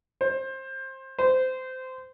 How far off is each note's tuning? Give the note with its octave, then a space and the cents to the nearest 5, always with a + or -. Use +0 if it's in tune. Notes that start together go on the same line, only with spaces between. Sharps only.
C5 +20
C5 -20